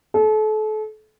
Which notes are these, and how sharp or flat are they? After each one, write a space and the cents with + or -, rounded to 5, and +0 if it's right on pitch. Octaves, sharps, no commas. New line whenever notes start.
A4 -35